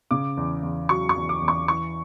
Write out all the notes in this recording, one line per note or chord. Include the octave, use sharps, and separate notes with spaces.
C#3 D6
E2
E2
F#3 C#6
C#6
E2
D6
E2
C#6
E3 C#6